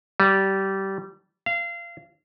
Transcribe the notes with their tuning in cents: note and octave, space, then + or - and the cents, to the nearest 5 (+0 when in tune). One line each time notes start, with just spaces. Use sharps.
G3 -20
F5 -25